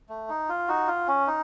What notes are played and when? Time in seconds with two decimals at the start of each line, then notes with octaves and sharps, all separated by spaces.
0.09 A3
0.29 D#4
0.49 F4
0.68 D#4 F#4
0.87 F4
1.08 C#4
1.27 D#4